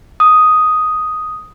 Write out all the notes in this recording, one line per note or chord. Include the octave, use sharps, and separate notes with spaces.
D#6